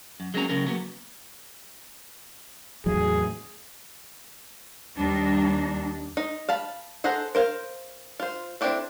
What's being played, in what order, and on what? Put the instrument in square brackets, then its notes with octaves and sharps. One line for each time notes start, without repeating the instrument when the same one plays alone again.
[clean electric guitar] F#2
F#3 G#3 A#3 C4 C#4 A#5
C#3 F#3 C#4 A#4
F#3 A#3 B3
[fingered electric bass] E2 A2 F#3 [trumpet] G#4
[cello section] D#2 G3 D4 D#4
[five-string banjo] D#4
F5 A5 B5
G#4 A4 C5 F#5 A#5
A#4 C5 F5
F4 C5
C4 D4 E4 G4 A4